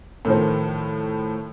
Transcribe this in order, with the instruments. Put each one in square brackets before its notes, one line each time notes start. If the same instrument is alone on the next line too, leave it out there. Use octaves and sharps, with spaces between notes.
[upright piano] A2 D#3 F3 C5